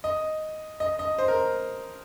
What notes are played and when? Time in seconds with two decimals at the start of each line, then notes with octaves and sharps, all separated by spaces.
0.04 D#5
0.80 D#5
0.99 D#5
1.19 C5
1.28 A#4